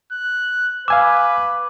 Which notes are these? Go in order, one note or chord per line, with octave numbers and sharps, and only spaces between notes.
F#6
B4 F5 G#5 D6 E6